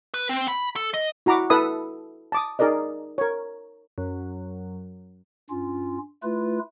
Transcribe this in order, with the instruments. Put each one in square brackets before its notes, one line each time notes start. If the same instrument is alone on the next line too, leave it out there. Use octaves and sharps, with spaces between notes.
[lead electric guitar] B4
C4
B5
A4
D#5
[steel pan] E4 F#4 A#5 B5 D6
E4 A4 B4 E5 B5 D#6
A5 D6 D#6
D#4 G#4 A#4 D5 D#5
A#4 C#5
[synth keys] F#2
[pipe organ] G2 C#4 F4
A3 E4 F4 B4